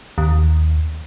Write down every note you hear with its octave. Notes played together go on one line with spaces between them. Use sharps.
D#2